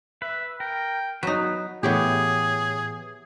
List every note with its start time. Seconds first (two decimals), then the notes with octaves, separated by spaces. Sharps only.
0.22 B4 E5
0.60 A#4 G5
1.23 F#3 B3 D#4 B4
1.83 A2 E3 B3 G4 G#4 C#5